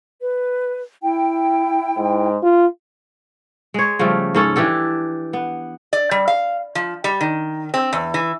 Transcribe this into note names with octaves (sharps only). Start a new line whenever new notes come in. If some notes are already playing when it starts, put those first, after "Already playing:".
B4
E4 G5
G#2
F4
G#3 C#5
C#3 F3 G3 A3
G#2 C#4 A4
E3 D4 G4 A4
B3
D5
G3
F5
F3
G3
D#3
C4
E2
E3